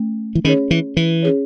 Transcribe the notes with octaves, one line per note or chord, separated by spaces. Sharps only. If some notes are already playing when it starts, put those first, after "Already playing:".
Already playing: A3 C#4
E3
D#3 C#4 G#4 C#5
E3
E3
C#4 G#4 C#5